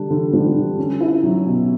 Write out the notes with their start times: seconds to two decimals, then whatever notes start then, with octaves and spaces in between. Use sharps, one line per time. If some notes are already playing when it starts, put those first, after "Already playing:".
Already playing: D3 G3 D4
0.10 D3
0.33 G3
0.56 D3
0.79 C#4
1.01 E4
1.23 F#3
1.46 B2